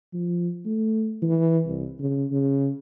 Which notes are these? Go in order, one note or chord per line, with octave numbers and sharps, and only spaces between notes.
F3
A3
E3
C2
C#3
C#3